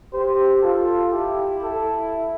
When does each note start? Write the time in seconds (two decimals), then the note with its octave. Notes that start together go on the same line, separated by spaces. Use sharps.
0.13 G4 C5
0.63 F4 A4
1.12 E4 G4
1.63 A4